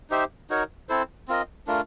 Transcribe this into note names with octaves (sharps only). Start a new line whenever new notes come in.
D#4 G4 C5 E5
D#4 F#4 A#4 C#5
C4 E4 A4 C5
C4 F4 A#4 D#5
A3 D4 F4 A#4